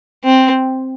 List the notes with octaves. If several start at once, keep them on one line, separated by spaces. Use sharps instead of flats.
C4